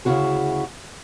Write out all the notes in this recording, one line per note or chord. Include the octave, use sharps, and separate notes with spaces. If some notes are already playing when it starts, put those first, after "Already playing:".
D2 C#3 F3 E4 F#4 G#4